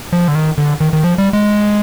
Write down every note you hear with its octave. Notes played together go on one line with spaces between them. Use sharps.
F3
D3
D#3
D3
D#3
D#3
F3
G3
G#3